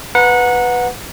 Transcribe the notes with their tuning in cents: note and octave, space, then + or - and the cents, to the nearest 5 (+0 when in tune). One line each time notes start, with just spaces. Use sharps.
B4 +0 F#5 -20 A#5 +0